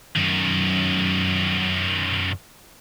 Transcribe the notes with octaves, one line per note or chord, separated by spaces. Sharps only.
F#2 D#3